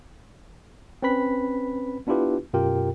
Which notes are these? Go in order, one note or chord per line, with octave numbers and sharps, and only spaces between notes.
C4 C#4 B4 B5 B6
B3 D4 E4 F4 G4 B4
F#2 B2 F4 G4 A#4 G5